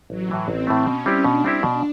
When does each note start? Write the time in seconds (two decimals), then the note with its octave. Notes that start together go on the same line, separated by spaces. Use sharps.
0.10 A1 F#3
0.29 A2 E3 A3
0.48 A1 C4
0.67 A2 E3 A3
0.87 B2 C#4
1.06 G3 C4 E4 G4
1.24 B2 D4
1.44 G3 C4 E4 G4
1.63 B2